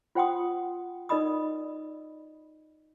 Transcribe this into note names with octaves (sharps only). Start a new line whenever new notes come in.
F4 C5 F#5 G5 C6 D#6
D#4 A#4 D5 D#5 B5 D#6